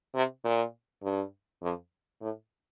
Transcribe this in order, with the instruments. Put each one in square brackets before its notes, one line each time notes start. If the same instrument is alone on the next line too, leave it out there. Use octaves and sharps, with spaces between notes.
[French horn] C3
A#2
G2
F2
A2